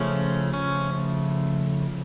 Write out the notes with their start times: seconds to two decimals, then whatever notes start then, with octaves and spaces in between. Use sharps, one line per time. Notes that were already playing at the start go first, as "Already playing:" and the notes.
Already playing: C#3 F3 A3 C#4
0.53 C#4